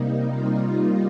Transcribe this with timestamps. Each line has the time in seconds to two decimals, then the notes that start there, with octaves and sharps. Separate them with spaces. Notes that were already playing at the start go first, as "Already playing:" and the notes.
Already playing: C3 G3 A#3 D#4
0.28 F4